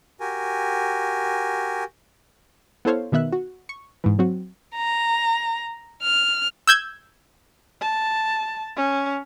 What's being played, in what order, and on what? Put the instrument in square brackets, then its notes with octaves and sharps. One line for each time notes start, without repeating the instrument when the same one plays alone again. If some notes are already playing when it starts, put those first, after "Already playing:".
[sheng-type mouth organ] F#4 G4 A#4 G#5
[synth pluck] B3 E4 A4 C5 C#5 F5
B2 D#3 B3 E5 F#6
F#4
C#6
G#2 E3
F#3 C4 F#4
[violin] A#5
F6
[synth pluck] E6 G6 G#6
[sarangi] A5
C#4